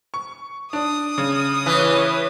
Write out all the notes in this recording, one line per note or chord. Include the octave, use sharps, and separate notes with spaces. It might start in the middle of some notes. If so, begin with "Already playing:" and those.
C#6
D4 D#6
C#3
E3 B4 C#5